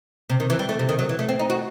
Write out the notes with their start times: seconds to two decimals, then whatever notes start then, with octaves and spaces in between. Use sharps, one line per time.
0.30 C3
0.40 D#3
0.50 E3
0.59 G3
0.69 A3
0.79 C3
0.89 D#3
0.99 F#3
1.09 E3
1.19 A3
1.29 C4
1.39 D#4
1.50 F#4